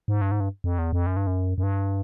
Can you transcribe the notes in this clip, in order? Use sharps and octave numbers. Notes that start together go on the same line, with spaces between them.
G#2
G2
G#2
G2
F2
E2
F2
F#2
G2
F#2
F#2
G2